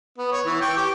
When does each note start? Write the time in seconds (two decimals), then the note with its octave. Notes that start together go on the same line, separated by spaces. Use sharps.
0.18 B3
0.32 C#5
0.46 E3
0.61 G5 C#6 D6
0.77 G4